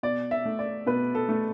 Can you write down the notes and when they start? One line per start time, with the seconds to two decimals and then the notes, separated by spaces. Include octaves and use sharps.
0.03 B2 D5
0.31 E5
0.46 A3
0.59 D5
0.87 B2 B4
1.15 A4
1.29 A3